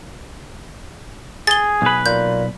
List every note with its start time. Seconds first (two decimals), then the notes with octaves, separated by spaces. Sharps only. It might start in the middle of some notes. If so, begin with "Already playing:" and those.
1.47 G#4 A6 G7
1.82 B1 B4
2.06 A#2 G6